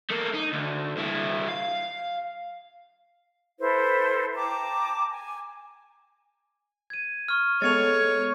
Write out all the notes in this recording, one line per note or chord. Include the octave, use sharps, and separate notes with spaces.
A3 A#3
D#4
D2
G2 E4
F5
E4 A4 B4 C5
G5 A5 A#5 D6
G#5
G#6 D#7
C#6 F6
G#3 B3 A4 C#5 A6 C#7 F7